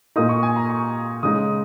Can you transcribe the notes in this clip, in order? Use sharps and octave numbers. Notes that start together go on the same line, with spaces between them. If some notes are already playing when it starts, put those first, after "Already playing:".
A#2 A#3 D#4 D#6
C#6
G#5
A#5
C#6
C#3 G#3 D#4 D#6